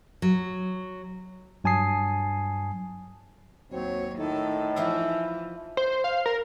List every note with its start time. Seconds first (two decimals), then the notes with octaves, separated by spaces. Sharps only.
0.22 F#3
1.64 G2 F#3 G#5 A5 D#6 C7
3.72 D#2 F#3 C4 C#5
4.19 A2 D#3 D#4 A4
4.76 E3 F3 E4
5.77 C5
6.04 F5
6.26 A#4